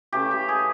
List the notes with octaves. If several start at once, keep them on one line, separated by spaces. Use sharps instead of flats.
C#3 E3 A3 G4
G4
G#4